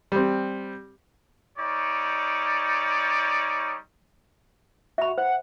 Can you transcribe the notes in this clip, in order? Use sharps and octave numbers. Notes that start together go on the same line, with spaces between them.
G3 C4
G3 D#4 C#5 D5
F#4 E5 B5
C5 F#5